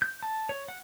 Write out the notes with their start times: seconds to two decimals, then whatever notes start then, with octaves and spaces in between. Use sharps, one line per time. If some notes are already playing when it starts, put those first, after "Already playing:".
0.02 G6
0.23 A5
0.49 C#5
0.68 F#5